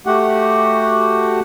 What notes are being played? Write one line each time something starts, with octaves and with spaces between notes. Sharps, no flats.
A3 F#4 G4 F#5